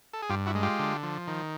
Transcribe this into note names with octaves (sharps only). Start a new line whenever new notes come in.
A4
G#4
G2 F4 G4
E4 F#4
G#3
F4 G4
D3
F3
D#3